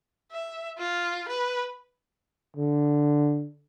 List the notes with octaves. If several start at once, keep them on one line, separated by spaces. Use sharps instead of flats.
E5
F4
B4
D3